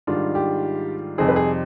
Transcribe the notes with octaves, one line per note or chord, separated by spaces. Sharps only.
G#2 D#3 G3 D4 F4
G4
F2 C3 G3 C4 D#4 G#4
B4
G#4